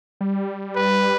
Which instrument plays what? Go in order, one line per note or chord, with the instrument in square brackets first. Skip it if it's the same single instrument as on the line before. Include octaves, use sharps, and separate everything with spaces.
[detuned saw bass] G3
[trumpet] B4